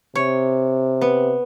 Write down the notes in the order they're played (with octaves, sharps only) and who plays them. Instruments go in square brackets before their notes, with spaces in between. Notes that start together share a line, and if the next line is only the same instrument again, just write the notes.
[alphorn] C3 [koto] C#5
[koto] B3